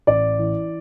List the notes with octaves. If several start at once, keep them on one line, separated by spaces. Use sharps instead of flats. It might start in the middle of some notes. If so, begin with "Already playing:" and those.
A1 D5
E3